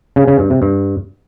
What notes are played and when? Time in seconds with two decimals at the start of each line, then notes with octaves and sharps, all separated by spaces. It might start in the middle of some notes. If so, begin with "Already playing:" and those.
0.16 C#3
0.28 C#3
0.39 G2
0.50 C3
0.62 G2